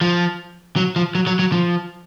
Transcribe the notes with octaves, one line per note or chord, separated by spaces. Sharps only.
F3
F#3
F3
F#3
F#3
F#3
F3